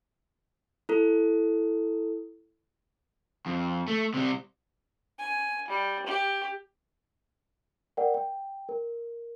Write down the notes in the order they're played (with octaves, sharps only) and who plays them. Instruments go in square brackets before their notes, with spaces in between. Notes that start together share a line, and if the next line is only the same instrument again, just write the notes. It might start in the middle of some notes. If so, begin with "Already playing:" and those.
[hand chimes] E4 A4
[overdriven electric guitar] F2
A3
C3 G3
[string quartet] G#5
G3
G4
[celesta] A#4 D5 F#5 G5
G5
A#4